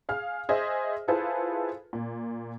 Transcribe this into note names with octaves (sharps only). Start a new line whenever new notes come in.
G#4 F5 F6
G#4 C5 D#5 E5
E4 F4 G#4 A4 B4 C5
A#2